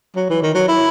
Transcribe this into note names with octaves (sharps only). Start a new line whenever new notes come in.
F#3
E3
D#3
F#3
E4